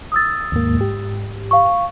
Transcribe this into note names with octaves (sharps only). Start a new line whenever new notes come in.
D#6 E6 A6
D#2 G#2 A#3
G#2 G4
F5 C#6